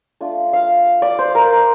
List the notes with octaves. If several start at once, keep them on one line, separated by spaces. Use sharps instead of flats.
A3 D4 F4
F5
D5
C5
A#4